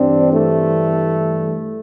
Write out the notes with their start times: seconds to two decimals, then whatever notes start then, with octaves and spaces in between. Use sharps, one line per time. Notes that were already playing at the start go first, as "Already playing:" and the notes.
Already playing: G2 E3 G3 C4 D4
0.33 A3